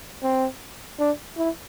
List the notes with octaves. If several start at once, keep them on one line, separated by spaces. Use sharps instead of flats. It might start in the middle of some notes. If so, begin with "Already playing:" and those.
C4
D4
E4